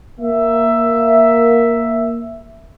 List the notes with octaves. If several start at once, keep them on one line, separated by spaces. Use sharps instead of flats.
A#3 E5